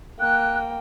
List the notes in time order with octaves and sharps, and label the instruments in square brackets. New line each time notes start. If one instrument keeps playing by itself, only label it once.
[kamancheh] A#3 G5 [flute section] F#6